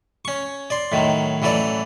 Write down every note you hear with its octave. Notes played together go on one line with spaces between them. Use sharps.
C#4 C#6
D5 C6
A2 D#3 F#3
A1 E3 F#3 A4 D5